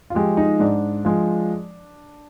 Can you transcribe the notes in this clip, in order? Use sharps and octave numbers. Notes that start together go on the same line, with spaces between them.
F4
F3 G#3 G4
D#4
G#2 D4
F3 G#3